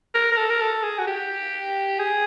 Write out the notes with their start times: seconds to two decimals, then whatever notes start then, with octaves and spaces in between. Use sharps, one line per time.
0.14 A#4
0.32 A#4
0.37 A4
0.50 A#4
0.61 A4
0.83 G#4
0.98 F#4
1.07 G4
1.99 G#4